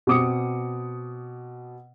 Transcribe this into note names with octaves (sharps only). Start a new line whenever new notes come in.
B2 C4 D6 D#6 C#7